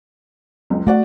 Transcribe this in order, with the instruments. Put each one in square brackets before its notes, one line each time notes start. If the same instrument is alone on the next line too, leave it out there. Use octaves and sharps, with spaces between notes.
[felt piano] F#1 C#2
[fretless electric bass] A3 [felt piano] F#4 D5 F#5